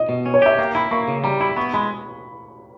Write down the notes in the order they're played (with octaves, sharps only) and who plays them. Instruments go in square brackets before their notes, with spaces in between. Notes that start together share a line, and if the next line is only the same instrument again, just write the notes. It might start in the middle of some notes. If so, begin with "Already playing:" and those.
Already playing: [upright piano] D#5
[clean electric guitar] B2
C#4
[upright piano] C#5
[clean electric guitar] G4 [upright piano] E5
[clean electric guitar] A#3 [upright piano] G5
[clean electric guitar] E4 [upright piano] B5
[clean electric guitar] A#3 [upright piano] C#6
[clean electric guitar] C#3
[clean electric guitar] G3 [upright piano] A#5
[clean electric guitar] E4 [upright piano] B5
[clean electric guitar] B3 [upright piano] C#6
[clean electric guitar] G#3 [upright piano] B5